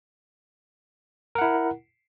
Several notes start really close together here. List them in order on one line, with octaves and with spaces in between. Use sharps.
A#4 F#5 E4